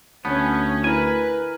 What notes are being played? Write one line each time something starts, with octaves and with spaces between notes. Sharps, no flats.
D2 B3 C#4 A5 G6
E4 A#4 B4 G#5